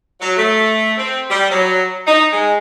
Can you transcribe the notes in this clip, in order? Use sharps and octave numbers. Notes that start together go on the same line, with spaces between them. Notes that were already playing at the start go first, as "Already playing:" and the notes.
F#3
A3
C4
G3
F#3
D#4
G#3